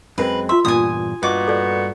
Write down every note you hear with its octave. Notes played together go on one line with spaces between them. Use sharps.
F#2 G#3 C4 A#4 B4
F4 E5 C6
E2 G2 A#2 G#5 D#6
G2 A#2 B3 F#4 D#5 D6
A4 D5